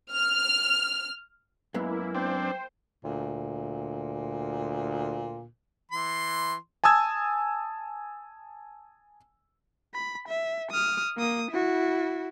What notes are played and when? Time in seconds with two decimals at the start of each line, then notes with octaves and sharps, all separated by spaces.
0.11 F6
1.74 F#2 G#3 A#3 B3 E4
2.15 C4 D4 C5 G5
3.04 D2 A#2
5.92 E3 C6
6.84 G#5 A5 D#6 E6 G#6
9.94 B5
10.28 E5
10.71 D#6 F6
11.18 A#3 D#6
11.51 E4 F#4